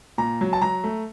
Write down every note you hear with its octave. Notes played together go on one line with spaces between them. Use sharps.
A#2 A#5
F#3
A5
F#3 A#5
A3